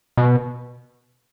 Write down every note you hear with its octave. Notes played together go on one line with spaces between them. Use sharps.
B2